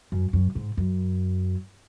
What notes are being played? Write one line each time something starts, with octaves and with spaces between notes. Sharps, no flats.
F#2
F#2
G#2
F#2